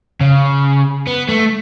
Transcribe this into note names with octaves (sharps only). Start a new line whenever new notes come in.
C#3
B3
A3